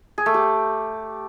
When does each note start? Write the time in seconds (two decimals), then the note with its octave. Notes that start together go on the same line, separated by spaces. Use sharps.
0.18 G#4
0.26 A3
0.34 G4